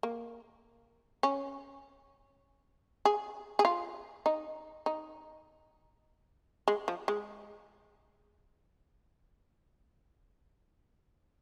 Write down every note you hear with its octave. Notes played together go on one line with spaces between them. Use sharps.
A#3
C#4
G#4
G#4
F4
D#4
D#4
G#3
F3
G#3